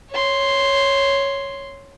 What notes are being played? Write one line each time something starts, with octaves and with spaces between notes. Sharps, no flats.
C#5 C6